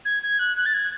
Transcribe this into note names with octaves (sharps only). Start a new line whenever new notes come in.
G#6
G#6
F#6
F#6
A6
G#6